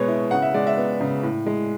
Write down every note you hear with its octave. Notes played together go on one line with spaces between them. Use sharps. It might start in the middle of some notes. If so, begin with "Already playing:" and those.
Already playing: B2 G#3 B3 C#5
E4
C#3 F#5
E5
G#3 D5
E5
B3
C#3
A2
G#3